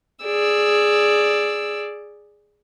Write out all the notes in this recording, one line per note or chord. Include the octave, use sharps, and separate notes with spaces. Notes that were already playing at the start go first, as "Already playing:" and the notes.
G#4 D5 E6